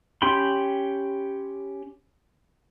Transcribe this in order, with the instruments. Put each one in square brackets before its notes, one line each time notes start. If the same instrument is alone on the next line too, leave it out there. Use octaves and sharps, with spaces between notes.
[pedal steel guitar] C#4 G4 G5 B5 C6